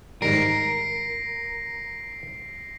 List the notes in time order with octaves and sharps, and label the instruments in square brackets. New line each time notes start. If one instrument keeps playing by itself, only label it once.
[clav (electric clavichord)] G#2 D#3 G3 [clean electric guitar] A#4 [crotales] A#6 C7 D7